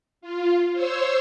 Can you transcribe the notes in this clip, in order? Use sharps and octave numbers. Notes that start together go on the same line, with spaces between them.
F4
C5 C#5 E6